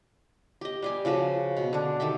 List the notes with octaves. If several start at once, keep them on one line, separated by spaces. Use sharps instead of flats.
G4 D#5
G3 G4 G#5
C#3 F3 F#4 B4
B2
D3 D4
D#3 G4 A4 E5